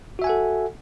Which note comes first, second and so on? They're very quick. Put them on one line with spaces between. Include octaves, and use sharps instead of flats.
F#4 E5 G#5 F#5 A4